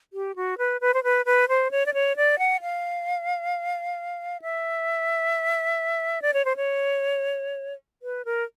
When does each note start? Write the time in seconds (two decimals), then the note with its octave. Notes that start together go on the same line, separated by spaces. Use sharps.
0.13 G4
0.36 F#4
0.58 B4
0.81 B4
0.94 C5
1.04 B4
1.26 B4
1.49 C5
1.71 C#5
1.86 D5
1.94 C#5
2.17 D5
2.39 F#5
2.61 F5
4.42 E5
6.22 D5
6.34 C#5
6.45 C5
6.56 C#5
8.02 B4
8.25 A#4